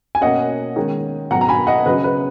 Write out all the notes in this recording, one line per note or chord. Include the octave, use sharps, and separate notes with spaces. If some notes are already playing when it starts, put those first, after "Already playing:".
G#5
B2 A#3 C#4 D#5 F#5
D#3 G#3 C#4
B2 F#3 B3 F#5 A#5
A#5
G#5 B5
D#5 F#5
C#3 F#3 C#4 B4 D#5
B4